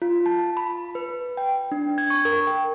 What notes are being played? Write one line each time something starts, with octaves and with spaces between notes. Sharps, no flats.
F4
A5
B5
B4
G5
D4
G#6
C#6
A#4
G5